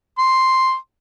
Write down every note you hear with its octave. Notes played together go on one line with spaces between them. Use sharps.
C6